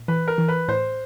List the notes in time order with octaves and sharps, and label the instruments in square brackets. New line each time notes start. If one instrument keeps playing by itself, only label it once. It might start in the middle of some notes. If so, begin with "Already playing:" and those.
Already playing: [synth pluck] A#2
[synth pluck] E3 [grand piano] B4
[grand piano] A#4
[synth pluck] E3
[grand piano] B4
[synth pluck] A2 [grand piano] C5